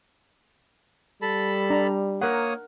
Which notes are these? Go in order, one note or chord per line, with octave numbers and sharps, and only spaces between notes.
G3 A4 A5 B5
D4 A#5
A#3 A#4 C#5 F#5 D#6